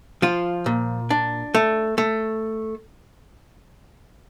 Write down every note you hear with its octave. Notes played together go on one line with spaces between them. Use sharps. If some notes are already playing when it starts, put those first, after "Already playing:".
F3 F4
A#2
D4
A3
A3